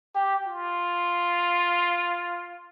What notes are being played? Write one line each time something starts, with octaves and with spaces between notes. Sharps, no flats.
G4
F4